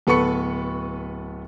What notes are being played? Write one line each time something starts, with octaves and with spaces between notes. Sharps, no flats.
D1 B3 A4 B4 C#6 C#7